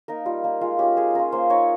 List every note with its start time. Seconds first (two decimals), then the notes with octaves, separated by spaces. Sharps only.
0.08 A#3 D#4 A#4
0.25 G3 F4
0.44 A#3 D#4
0.61 G#3 F4
0.79 C#4 F4 G4
0.97 G#3 G#4
1.14 C#4 F4 A#4
1.32 A#3 C5
1.50 D#4 C#5